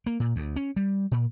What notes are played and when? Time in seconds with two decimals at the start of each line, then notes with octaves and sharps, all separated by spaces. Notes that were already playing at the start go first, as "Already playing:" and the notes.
0.06 A#3
0.20 A#2
0.36 D2
0.56 C#4
0.76 G3
1.11 A#2